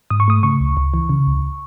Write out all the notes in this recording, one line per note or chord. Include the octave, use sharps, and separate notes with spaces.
G#2 D#6
C#6
A3 D#6
C#3 C#6
C#2
C#2
E3
C#3
C#2